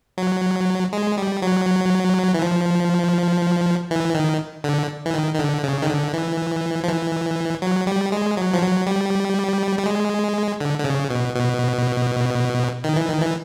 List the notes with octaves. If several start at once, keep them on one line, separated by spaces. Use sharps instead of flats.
F#3
G#3
G3
F#3
E3
F3
E3
D#3
D3
E3
D#3
D#3
D3
C#3
D#3
D3
E3
F3
E3
F#3
G3
G#3
F#3
F3
F#3
G3
G3
G#3
D3
D3
C#3
B2
B2
D#3
E3
D#3
E3